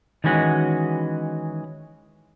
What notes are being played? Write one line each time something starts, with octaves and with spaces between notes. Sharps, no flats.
D#3 E3 G#3 C#4 F#4